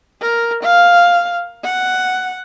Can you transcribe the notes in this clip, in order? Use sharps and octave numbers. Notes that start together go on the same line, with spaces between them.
A#4
F5
F#5